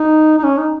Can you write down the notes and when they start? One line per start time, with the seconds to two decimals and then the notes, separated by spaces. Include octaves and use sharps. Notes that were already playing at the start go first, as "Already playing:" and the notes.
Already playing: D#4
0.39 D#4
0.43 C#4
0.58 D#4